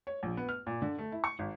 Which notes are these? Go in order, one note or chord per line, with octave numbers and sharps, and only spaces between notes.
C#5
A#1
B3
F6
A#2
D3
A3
E4
C#6
G#1